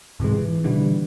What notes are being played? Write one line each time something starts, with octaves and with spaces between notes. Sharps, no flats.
G#2 C3 E3 G#3
E3
B2 D3 E3 G3